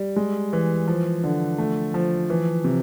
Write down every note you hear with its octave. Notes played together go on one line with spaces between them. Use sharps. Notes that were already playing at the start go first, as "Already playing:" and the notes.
Already playing: G3
G#3
E3
F3
D3
A3
F3
E3
C3